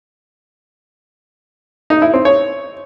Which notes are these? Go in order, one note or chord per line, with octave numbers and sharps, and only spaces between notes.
D#4
E4
C4
C#5